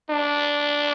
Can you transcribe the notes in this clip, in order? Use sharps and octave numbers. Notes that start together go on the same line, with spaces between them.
D4